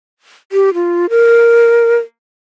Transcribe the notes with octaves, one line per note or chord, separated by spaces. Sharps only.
G4
F4
A#4